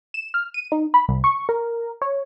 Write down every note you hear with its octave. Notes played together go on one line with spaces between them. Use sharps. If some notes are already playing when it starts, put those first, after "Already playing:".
E7
F6
D#7
D#4
B5
C2
C#6
A#4
C#5